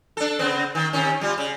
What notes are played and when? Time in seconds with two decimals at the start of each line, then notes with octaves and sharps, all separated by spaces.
0.17 D4 A4
0.39 C#3 B3 C4
0.75 D#3
0.93 C3 D#3 C#4
1.21 G3 F4
1.38 C#3